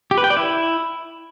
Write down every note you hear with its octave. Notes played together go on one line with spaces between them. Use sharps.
G4
B4
G5
D5
E4